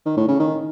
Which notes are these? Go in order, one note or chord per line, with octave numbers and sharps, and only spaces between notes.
D#3
A2
C#3
D#3